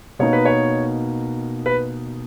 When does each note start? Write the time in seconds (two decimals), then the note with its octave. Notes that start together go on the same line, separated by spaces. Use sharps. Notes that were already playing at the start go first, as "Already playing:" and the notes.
0.19 B2 A#3 D#4 C#5
0.33 B4
0.45 C#5
1.66 B4